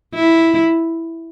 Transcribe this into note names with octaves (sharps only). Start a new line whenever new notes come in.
E4